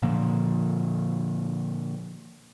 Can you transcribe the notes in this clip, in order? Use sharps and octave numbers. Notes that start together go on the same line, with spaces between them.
A#2 D3 F3 A#3